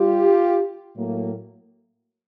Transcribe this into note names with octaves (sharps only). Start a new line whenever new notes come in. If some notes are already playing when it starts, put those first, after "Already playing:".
Already playing: G3 F4 G4
A2 F#3 A#3